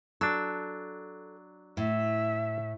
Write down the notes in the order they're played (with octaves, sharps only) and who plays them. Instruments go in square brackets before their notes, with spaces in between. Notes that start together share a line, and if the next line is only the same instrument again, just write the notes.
[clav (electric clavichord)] F#3 D4 [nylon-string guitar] A4
[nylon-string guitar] A2 [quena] E5